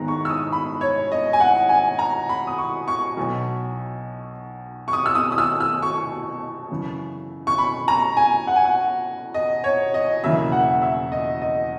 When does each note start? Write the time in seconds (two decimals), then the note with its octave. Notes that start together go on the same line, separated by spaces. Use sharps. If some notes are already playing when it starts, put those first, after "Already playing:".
Already playing: G#1 G#2 D#3 G#3 B3 A#5
0.08 C#6
0.25 E6
0.30 D#6
0.52 B5
0.81 C#5
1.12 D#5
1.33 G#5
1.40 F#5
1.69 G#5
1.99 A#5
2.29 B5
2.47 D#6
2.58 C#6
2.88 C#6
3.17 B1 B2 F#3
4.88 C#6
4.93 D#6
5.06 E6
5.15 D#6
5.32 D#6
5.38 E6
5.60 E6
5.82 C#6
6.70 F#2 C#3 E3
7.47 C#6
7.58 B5
7.88 A#5
8.17 G#5
8.47 F#5
8.56 G#5
8.65 F#5
9.34 D#5
9.64 C#5
9.94 D#5
10.23 E1 E2 C#3 F#3 A#3 E5
10.52 F#5
10.82 E5
11.12 D#5
11.42 D#5